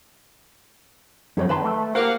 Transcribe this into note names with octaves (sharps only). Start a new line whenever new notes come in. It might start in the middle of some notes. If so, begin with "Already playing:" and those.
F#2 F3 F#3 C4
D#3 B4 A5 C6
A3
A#3 G4 A#4 C5 F5 F#5